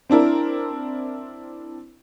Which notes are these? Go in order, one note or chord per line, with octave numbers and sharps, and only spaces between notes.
C4 D4 E4 A#4